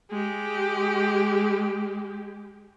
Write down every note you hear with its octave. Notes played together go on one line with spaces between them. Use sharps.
G#3 G4